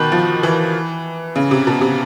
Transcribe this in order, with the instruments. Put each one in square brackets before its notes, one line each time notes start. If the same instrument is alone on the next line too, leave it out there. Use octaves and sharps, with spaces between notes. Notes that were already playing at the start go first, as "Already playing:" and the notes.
Already playing: [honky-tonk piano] B2 D#3 [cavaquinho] G4 B4
[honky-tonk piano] F3
E3
C#3
C3
B2
C3